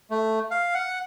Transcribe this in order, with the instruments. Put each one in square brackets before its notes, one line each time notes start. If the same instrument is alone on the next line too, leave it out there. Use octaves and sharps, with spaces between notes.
[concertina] A3
F5
F#5